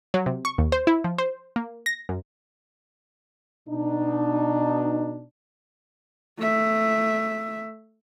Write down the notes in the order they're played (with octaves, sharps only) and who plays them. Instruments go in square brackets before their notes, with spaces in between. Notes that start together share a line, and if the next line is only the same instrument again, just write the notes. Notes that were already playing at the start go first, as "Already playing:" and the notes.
[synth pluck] F#3
C3
C#6
D#2
C5
E4
F3
C5
A#3
A#6
F#2
[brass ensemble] B2 D4 D#4
[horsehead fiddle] A3 E5